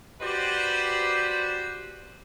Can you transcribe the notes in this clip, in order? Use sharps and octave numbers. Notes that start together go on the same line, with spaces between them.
F#4 G4 B4 C5 D5